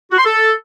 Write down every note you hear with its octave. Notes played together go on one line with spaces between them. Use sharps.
F#4
C6
A4